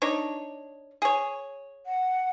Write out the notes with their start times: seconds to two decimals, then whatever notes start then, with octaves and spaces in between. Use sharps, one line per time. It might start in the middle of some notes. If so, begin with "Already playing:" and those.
0.02 D4 D#4 C#5
1.02 G#4 C#5
1.86 F#5